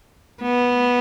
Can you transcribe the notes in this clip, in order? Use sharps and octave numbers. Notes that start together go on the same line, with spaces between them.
B3